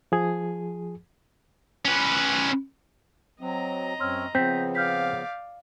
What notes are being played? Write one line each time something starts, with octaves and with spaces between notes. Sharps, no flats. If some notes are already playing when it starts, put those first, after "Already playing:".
F3 G#4
C#4 B4
F#3 C4 D#5 A#5
F#2 C4 C#5 C6 E6 F6
C#3 F3 B3 C4 G6 B6
D5 F5 F6 G6 B6